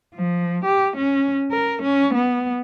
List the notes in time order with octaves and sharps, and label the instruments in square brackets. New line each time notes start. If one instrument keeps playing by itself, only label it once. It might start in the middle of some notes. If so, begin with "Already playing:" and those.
[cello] F3
G4
C#4
A#4
C#4
B3